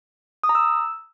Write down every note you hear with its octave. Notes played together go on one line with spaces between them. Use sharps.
D#6
A#5
E6